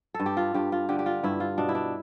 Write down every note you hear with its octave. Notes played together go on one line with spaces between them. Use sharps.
A4
G2
G4
F4
G2 G4
F4
D3 G4
G4
F4
G2 E4
F4
B2 D4
E4
D4